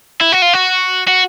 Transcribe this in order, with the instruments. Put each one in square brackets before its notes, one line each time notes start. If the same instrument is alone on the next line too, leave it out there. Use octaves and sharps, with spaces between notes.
[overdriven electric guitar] E4
F#4
F4
F#4
F#4